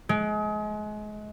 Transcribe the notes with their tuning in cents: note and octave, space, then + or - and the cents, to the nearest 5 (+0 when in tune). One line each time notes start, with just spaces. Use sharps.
G#3 +30